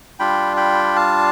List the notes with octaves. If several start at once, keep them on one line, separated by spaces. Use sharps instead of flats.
G3 D4 F4 G5 B5
G5 B5
F5 A5